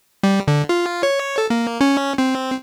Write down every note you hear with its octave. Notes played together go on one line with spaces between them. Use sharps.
G3
D3
F4
C#5
A4
A#3
C#4
C4